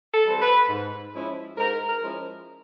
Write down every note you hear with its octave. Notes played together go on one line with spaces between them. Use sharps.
A4
E3 G3 C4
B4
G#2
F3 G#3 C#4 E4
G#2 A#4
A#4
F3 G#3 C#4 E4